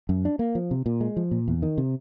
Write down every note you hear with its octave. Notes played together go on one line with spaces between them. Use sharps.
F#2
D4
A#3
F3
C3
A#2
G#3
F3
A#2
E2
D#3
C3